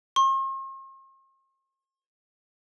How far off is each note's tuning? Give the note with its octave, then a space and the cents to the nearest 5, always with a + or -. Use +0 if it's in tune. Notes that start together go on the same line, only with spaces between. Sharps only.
C6 +45